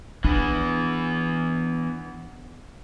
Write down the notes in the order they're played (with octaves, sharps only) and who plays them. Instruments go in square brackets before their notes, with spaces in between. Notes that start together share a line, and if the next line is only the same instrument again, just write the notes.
[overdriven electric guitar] E3 B3 [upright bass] D4